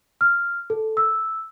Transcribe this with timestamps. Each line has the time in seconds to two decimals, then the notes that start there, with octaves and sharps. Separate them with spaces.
0.21 F6
0.70 A4
0.97 E6